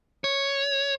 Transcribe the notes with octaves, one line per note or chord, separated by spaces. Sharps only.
C#5